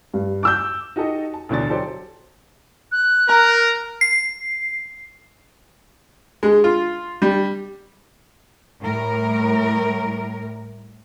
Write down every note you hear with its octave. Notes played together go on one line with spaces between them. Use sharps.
G2
D6 E6 G6
D#4 F#4 G4 A4 D#5
A5
A1 D2 B2 D4 A6
F#3 G4 A4 C5 D5
F#6
A#4 A#5
C7
G#3
F4
G3
A2 G3 A#4